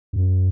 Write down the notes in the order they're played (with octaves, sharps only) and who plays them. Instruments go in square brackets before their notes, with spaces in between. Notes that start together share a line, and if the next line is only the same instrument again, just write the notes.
[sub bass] F#2